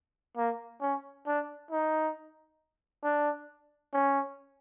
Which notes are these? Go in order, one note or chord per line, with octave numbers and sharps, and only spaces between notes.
A#3
C#4
D4
D#4
D4
C#4